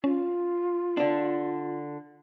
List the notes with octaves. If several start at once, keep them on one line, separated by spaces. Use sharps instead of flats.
C#4 F4
D3 D4